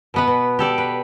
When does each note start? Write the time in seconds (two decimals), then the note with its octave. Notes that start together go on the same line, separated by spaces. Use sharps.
0.14 B2 B3 B4
0.28 B2
0.59 G4 A4 D5
0.78 B4